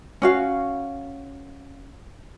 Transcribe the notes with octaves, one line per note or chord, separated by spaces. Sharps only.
C#4 F#4 F5